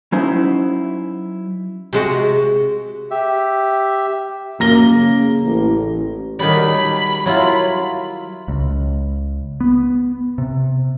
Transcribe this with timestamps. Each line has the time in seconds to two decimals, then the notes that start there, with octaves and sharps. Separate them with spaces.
0.12 F#3 C#4 D#4 E4 C5 E5
1.93 C3 G#3 F#4
3.11 G4 E5
4.60 F#2 A#3 A#6 G7
4.91 C#3
5.44 A1
6.39 D#3 F#3 G3 B5
7.26 F#3 E4 F4
8.48 C#2
9.60 B3
10.38 C3